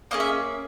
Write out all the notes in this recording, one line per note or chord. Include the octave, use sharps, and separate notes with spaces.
A#3 C#4 G#4 D#5
E5